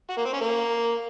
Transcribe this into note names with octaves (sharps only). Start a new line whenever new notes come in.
F#4
A#3
C4
C#4
A#3